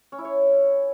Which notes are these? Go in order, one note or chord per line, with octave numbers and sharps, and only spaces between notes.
C#4
E4
C#5